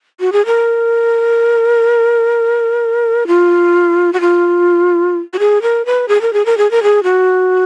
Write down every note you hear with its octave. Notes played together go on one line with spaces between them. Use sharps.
F#4
G#4
A#4
F4
F#4
F4
F#4
G#4
A#4
B4
G#4
A#4
G#4
A#4
G#4
A#4
G#4
F#4